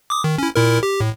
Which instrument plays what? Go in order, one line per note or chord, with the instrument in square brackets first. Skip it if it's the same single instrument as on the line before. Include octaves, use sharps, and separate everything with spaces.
[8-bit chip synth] D6 D#6
D#3
C#4 E4
A#2 E4 A#4
G4
A2